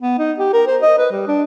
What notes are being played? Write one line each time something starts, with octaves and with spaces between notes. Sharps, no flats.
B3
D#4
G4
A#4
C5
D#5
B4
G3
D4